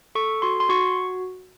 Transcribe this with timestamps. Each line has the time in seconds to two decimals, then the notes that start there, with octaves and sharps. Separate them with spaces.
0.15 A4 C#6
0.42 F#4 C6
0.60 C6
0.69 F#4 C#6